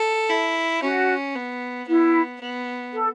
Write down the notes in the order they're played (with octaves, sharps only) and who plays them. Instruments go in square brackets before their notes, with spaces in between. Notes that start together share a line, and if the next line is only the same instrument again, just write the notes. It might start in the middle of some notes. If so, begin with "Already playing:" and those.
Already playing: [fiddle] A4
E4
[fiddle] C#4 [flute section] F#4
[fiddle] B3
[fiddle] B3 [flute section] E4
[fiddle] B3
[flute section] A4